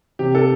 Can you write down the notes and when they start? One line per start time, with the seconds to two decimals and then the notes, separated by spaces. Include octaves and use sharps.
0.19 C3 G4
0.35 A4